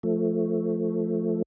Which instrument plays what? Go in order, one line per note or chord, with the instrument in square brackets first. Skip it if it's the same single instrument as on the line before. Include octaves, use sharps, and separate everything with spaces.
[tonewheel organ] F3 A3